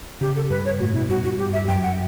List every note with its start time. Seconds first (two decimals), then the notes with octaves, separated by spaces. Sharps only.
0.21 C#3 G4
0.36 A4
0.50 G2 B4
0.65 C#5
0.80 A2 F#4
0.94 B2 E4
1.09 G2 F#4
1.24 G2 F#4
1.38 G4
1.53 E5
1.68 F#2 G5
1.83 F#5